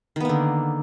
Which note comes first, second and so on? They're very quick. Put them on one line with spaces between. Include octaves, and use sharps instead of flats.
D#3 B3 A#3 D3